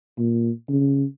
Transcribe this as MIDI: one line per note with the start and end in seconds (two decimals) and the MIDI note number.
0.18 0.51 46
0.69 1.04 49